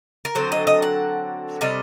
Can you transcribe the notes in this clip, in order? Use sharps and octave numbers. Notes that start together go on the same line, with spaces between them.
A#4
D3 F#3 C4 C5
D#5
D#5
F#5
C3 G3 D4 D#5